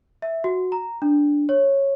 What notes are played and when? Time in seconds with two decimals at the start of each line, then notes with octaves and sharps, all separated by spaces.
0.22 E5
0.44 F#4
0.72 A#5
1.02 D4
1.49 C#5